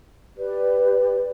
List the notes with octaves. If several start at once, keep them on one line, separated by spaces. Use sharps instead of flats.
G4 B4 D5